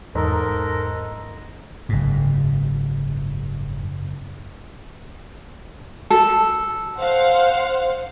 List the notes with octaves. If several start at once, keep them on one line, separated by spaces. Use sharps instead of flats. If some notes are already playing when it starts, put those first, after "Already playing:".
E2 G#2 A4 A#4
F#1 G#2
A4
C5 F5 F#5